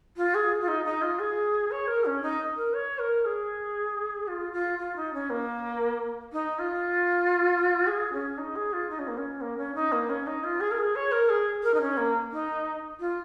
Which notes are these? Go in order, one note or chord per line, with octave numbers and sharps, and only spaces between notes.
F4
G#4
F4
D#4
D#4
F4
G#4
C#5
A#4
C#4
D#4
A#4
C#5
A#4
G#4
F4
F4
F4
D#4
C#4
A#3
D#4
F4
G#4
C#4
D#4
G#4
F4
D#4
C#4
A#3
C#4
A#3
C#4
D#4
A#3
C#4
D#4
F4
G#4
A#4
G#4
C#5
A#4
G#4
A#4
D#4
C#4
A#3
D#4
F4